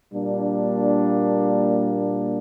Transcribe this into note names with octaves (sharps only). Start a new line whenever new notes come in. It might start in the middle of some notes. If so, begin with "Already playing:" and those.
A#2 G3 A#3 D4